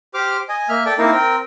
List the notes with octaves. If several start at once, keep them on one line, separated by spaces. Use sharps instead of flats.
G4 C5 D6 F6
D#5 G#5
A#3 E5 F6
A4 D5 G5 A5
A#3 C4 D#4 E4 A#4 C5
C4 A#4 G5